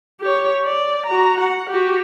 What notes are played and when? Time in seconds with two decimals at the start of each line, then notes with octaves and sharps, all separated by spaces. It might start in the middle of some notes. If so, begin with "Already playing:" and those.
0.21 G4 C#5
0.65 D5
1.06 F#4 A#5
1.40 F#5
1.70 F#4 G4